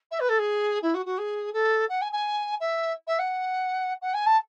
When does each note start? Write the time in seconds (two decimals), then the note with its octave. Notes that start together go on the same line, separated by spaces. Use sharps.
0.11 E5
0.20 B4
0.29 A4
0.39 G#4
0.82 E4
0.94 F#4
1.06 F#4
1.18 G#4
1.53 A4
1.89 F#5
2.01 G#5
2.12 G#5
2.60 E5
3.07 E5
3.19 F#5
4.02 F#5
4.14 G#5
4.26 A5